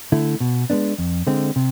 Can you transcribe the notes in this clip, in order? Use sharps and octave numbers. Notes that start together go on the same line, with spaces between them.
D3 A3 E4
B2
G#3 B3 D4
F2
D3 G#3 C4
C3